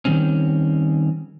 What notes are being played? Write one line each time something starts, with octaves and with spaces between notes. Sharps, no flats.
D#3 G3 C4 C#4